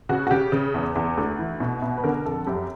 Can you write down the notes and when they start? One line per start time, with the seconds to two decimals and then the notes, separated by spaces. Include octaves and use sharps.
0.09 C#3 F#4
0.27 F#4
0.31 C#3 G4
0.52 C#3
0.74 E2
0.95 E2
1.17 D2
1.39 E3
1.60 B2
1.82 B2
1.98 B4
2.04 D3 A#4
2.26 F2 A4
2.47 F#2 G4